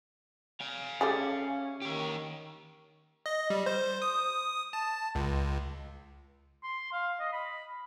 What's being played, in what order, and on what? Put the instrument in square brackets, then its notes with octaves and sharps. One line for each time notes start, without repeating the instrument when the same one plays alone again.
[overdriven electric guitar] F5 G#5
[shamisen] G3 A3 G#4 [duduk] C#4
[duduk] D#3 [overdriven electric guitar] G4 C#5
[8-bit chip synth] D#5
G3
C5
D#6
A5
C#2
[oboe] C6
F5
D#5
B5